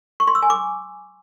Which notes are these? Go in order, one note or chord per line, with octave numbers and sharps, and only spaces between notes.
C#6
C6
E6
G#5
D6